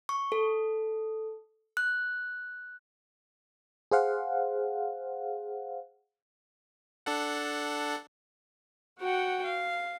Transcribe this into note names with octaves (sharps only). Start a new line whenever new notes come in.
C#6
A4
F#6
G#4 C5 F5 F#5
D4 A4 F#5
F#4 F#5 G5
F5